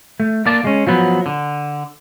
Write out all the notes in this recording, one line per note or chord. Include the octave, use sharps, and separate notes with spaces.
A3
A#3 D5 A5
G#3 C#4
F3 F#3 B3
D3